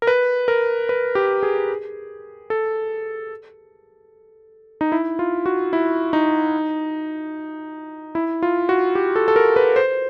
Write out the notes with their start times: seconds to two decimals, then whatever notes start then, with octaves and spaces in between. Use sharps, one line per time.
0.02 A#4
0.07 B4
0.48 A#4
0.89 B4
1.15 G4
1.43 G#4
2.50 A4
4.81 D#4
4.92 E4
5.19 F4
5.46 F#4
5.73 E4
6.13 D#4
8.15 E4
8.43 F4
8.69 F#4
8.95 G4
9.16 A4
9.28 A4
9.36 A#4
9.56 B4
9.76 C5